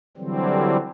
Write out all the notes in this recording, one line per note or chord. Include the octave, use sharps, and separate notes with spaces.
D3 E3 F#3 G3 C4